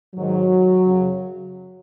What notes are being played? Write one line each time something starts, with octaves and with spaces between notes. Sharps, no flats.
G#2 D#3 F#3
F#2 C#3